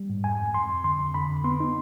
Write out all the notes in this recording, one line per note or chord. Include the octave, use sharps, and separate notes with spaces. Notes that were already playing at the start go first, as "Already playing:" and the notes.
Already playing: G3
G#2
F2 G#5
F2
F2 C6
F2
D3 C6
F2
D3 B5
F2
B3 C6
D#4